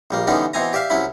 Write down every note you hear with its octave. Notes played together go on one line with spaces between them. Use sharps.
A#1 G3 A#3
D3 E3 G3 B3 C#4 D#4
B2 E3 C4 G#5 A#5
G4 D5 E5 F5
C2 F#3 C#4 E4 B5